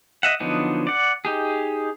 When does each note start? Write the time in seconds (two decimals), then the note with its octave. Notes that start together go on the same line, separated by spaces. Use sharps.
0.23 D#5 E5 F#5
0.40 D3 F3 F#3 B3 D#4
0.87 D5 F#5
1.25 D#4 G4 G#4